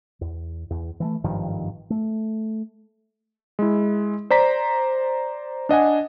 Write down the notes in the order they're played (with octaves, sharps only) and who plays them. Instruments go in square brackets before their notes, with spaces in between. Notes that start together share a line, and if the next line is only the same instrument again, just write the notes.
[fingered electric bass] E2
E2
E3 G#3 A3
G#1 G2 D#3 F3
A3
[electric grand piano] G#3 E4
C5 D5 A#5 B6
D4 D#5 F#5 G#5